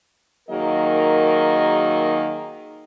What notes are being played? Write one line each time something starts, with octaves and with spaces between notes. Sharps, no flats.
D#3 F#3 A#3 G#4 A#4 D#5